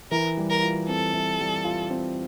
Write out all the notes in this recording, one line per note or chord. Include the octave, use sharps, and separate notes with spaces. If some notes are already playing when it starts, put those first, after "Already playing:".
E3 A#4
G3
A#4
F4
C4 A4
E3
G3
F4
C4